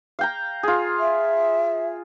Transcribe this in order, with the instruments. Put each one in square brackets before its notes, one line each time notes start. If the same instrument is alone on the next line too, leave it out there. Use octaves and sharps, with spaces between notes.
[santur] F5 G5 A#5
F4 G#4
[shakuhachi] E5